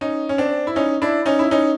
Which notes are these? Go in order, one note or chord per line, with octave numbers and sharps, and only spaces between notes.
C#4 D#4
C#4
C4 D4
E4
C#4 D#4
D4 E4
C#4 D#4
E4
C#4 D#4